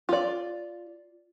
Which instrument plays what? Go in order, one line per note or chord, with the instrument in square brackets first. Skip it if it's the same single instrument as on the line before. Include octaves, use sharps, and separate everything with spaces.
[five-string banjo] F4 D5